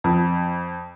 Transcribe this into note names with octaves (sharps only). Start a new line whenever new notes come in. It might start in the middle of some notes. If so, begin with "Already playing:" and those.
F2